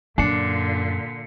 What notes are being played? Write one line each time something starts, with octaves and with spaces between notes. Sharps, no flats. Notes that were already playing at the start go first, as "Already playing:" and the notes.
F#2 A#2 D3 D4 C7 C#7